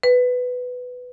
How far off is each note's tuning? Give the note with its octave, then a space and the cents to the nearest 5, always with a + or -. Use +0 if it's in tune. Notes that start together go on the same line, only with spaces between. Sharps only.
B4 +10